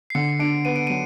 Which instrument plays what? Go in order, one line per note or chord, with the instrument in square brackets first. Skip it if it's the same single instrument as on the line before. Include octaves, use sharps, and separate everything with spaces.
[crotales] C7
[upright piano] D3 [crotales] C#7
[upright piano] D4 [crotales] D7
[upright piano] B3 [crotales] D#7
[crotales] D7
[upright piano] F#3 [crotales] D#7